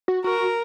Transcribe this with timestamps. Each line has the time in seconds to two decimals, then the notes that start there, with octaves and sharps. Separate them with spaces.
0.08 F#4
0.24 F#4 A#4